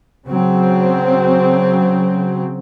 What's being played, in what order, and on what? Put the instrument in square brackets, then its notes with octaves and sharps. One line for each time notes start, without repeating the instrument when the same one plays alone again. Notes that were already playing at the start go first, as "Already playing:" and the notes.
[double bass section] C#3 F#3 C4